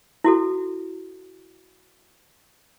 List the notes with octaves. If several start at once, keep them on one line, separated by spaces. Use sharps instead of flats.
E4 F#4 A4